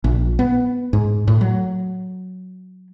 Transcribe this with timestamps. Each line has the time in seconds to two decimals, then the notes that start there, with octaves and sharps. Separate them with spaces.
0.04 A#1
0.39 B3
0.93 G#2
1.28 A2
1.41 F#3